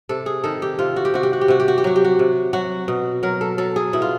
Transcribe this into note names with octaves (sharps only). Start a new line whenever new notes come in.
C3 A4
G#4
D#3 A4
G4
C3 F4
F#4
G4
C3 F#4
G4
F#4
G4
C3 F#4
G4
F#4
G4
F#3 F#4
G4
F#4
C3
F#3 F#4
B2
F#3 A#4
A4
F#3 A4
G#4
B2 E4
F4